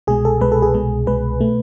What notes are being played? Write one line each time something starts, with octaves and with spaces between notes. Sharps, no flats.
C2 B2 G#3 G#4
A4
C2 B2 G#3 B4
A4
G#4
C2 B2 G#3
C2 B2 G#3 B4
B2 A3